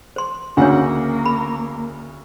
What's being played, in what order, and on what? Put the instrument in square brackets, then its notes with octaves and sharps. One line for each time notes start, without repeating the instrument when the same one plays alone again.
[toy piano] C5 C6
[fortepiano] D2 C#3 F#5 [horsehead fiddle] A#3 [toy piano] D4 C#5
[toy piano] B5